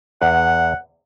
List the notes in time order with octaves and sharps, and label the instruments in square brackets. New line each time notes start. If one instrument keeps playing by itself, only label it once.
[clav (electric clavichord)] E2 [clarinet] F#5